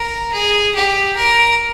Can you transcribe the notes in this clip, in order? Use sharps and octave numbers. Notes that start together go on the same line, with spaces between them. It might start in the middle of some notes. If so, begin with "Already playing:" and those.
Already playing: A#4
G#4
G4
A#4